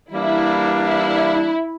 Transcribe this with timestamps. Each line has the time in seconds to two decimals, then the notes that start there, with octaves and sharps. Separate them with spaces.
0.11 E3 G3 A#3 D4 E4
0.84 E4